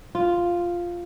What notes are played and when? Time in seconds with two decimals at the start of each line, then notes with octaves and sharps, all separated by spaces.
0.15 F4